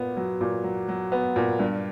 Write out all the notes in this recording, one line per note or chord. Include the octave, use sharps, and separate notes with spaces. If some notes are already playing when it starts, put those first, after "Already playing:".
Already playing: A#2 B3
F#3
A#2
F#3
F#3
B3
A#2
G2